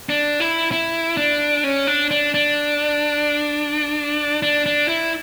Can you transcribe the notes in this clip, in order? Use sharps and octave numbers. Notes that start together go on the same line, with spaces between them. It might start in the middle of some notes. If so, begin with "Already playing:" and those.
D4
E4
E4
D4
C#4
D4
D4
D4
D4
D4
E4